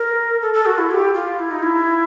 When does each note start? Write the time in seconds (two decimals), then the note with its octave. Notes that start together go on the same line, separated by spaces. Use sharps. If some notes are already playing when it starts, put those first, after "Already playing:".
Already playing: A#4
0.42 A4
0.54 A4
0.66 F#4
0.78 E4
0.91 G4
1.14 F4
1.39 E4
1.51 D#4
1.63 E4